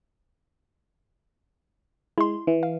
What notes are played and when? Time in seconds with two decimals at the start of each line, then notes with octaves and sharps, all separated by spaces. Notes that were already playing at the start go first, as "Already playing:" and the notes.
2.18 G#3 E4 C6
2.47 E3
2.63 F5